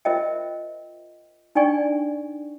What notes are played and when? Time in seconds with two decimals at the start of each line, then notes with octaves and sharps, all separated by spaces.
0.05 F4 A#4 C5 D#5 E5 G5
1.55 D4 D#4 D5 G5 G#5 C#6